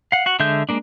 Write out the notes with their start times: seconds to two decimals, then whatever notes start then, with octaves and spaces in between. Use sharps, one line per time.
0.12 F5 F#5
0.26 F#4 F#5
0.40 D3 G#3 E5 G6
0.69 G#3 A#3 D4